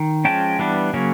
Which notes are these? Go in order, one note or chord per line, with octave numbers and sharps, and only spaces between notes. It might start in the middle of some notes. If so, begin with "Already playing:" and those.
Already playing: D#3
F3 G#3 C#4 G5 A5
E3 G3 B3 D4
C#3 F#3 A#3 C#4